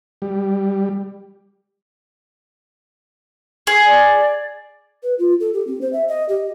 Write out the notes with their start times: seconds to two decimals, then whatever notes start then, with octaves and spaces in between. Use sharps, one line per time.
0.22 G3
3.67 G#4
3.86 D5
5.03 B4
5.19 F4
5.40 A4
5.54 G4
5.67 C4
5.81 C5
5.93 E5
6.08 D#5
6.29 G4